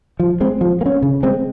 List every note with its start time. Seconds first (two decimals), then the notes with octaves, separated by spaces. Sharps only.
0.20 F3
0.40 G#3 C4
0.61 F3
0.81 A#3
0.86 C#4
1.02 C#3
1.23 G#3 C4